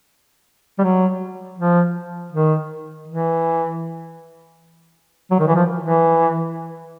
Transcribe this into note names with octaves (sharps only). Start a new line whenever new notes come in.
G3
F#3
F3
D#3
E3
F#3
D#3
E3
F3
E3